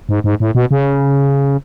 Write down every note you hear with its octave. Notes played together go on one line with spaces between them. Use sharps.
G#2
G#2
A2
B2
C#3